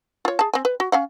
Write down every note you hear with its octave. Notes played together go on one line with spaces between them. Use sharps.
F4 C#5
G#4 A5
C4 G#5
B4
F#4
C#4 F5 F#5